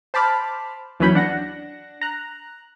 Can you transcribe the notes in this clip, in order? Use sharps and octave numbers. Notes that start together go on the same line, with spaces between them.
C5 A5 B5 D6 F6
D#2 E3 F#3 C#4 B5 G6
D4 F#5 A#6
A#5 F#6